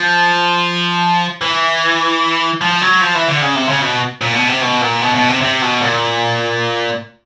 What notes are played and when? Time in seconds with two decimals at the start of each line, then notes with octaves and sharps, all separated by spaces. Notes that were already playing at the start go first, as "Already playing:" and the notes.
Already playing: F3
1.41 E3
2.61 F3
2.82 F#3
3.02 F3
3.15 E3
3.28 D3
3.42 C#3
3.55 C3
3.68 C#3
3.82 B2
4.21 A#2
4.35 B2
4.48 C3
4.62 B2
4.82 A#2
5.02 B2
5.15 B2
5.29 C3
5.42 C3
5.62 B2
5.81 A#2